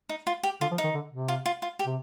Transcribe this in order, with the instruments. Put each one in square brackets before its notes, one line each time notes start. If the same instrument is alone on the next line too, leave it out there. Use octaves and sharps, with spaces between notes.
[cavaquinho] D#4
F4
G4
[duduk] D3 [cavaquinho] F4
[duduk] F3
[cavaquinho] D#4
[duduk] D#3
D3
C3
[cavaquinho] F4
F4
F4
G4
[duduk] C3